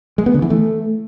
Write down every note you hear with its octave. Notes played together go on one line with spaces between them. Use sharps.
G#3
B3
D3
E3
A3